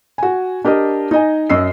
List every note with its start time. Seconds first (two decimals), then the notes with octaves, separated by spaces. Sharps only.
0.18 F#4 G#5
0.65 D4 G4 A#4 D#5
1.11 D#4 D#5 G#5
1.50 F#2 D#5 E6 C7